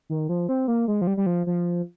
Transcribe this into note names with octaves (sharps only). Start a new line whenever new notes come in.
D#3
F3
C4
A#3
G#3
F3
G3
G3
F3
F3